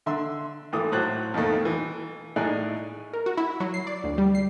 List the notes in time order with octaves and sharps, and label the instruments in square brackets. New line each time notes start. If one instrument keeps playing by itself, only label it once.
[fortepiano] D3 E5 C6 E6
G#1 E3 A3 D6 D#6
A2 F#3 C5 F#6
F2 B2 D#3 A3
E3
A2 D#4 E4 G#4 D5 F#6
[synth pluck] A#4
F#4
E4
F#3
C7
D5
D2
G3
C7